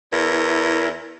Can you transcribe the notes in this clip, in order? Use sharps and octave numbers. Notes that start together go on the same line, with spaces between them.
E2 E4 A#4